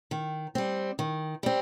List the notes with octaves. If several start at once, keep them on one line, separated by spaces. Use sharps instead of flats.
D#3
G3 C4
D#3
G3 C4